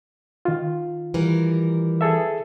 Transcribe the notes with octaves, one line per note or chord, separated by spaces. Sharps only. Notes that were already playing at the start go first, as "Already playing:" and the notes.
D#3 F4
E3 G3 A#4
G#4 A4 E5